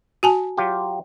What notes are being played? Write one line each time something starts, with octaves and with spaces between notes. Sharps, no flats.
F#4 G#5 A5
F#3 F4 G4